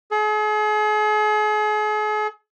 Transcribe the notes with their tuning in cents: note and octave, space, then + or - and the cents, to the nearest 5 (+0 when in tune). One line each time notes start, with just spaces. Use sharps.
G#4 +40